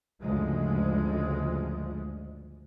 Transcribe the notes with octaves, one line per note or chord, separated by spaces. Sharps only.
D2 G2 C#3 F3 G#3